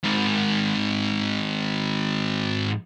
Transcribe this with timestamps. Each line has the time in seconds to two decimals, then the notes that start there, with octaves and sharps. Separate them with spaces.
0.04 G#2 D#3